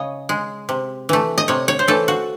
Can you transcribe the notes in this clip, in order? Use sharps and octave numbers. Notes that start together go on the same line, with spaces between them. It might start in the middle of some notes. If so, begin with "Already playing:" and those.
Already playing: C#3 C#5 D#5
G#3
C3
E3 A3
D#5
C3 C#5
C#5
C5
E3 A3 A4
F#4